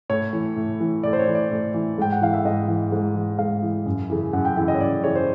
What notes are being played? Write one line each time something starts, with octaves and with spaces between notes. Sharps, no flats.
A2 C#5
E3
A2
E3
A2 D5
C5
C#5
E3
D5
A2
E3
G#2 G5
F#5
E3 F5
E5
G#2 D#5
E3
G#2
E3
G#2 F5
E3
F#2
C#3 E3
F#2 F#5
G5
C#3 E3 G5
D#5
C#5
F#2 D5
C#3 E3 C#5
C5